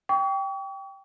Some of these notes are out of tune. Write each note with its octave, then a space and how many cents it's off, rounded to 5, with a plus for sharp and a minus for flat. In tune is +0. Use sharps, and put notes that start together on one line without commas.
G5 +0 C#6 +40